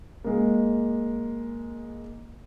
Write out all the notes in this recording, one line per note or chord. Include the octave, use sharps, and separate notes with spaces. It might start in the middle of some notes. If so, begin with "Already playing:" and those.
G#3 A#3